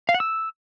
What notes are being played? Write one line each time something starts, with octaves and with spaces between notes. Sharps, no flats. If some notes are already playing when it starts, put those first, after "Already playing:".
F5
F#5
E6